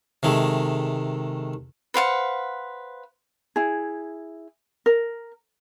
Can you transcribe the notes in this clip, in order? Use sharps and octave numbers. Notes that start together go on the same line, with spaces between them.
C3 D#3 G#3 A3
B4 C5 F5 F#5
E4 G#4
A#4